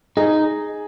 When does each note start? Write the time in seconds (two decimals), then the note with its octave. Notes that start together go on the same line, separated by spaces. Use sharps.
0.17 D#4 G#4